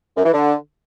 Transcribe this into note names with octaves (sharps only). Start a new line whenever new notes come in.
F#2
E3
D3